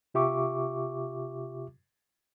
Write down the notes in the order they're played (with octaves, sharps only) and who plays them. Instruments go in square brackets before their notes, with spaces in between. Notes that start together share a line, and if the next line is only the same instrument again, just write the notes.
[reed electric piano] C3 F4 G4 E5 C#6 D6